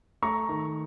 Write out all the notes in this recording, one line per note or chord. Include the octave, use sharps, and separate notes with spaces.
A3 A#5 C#6
D#3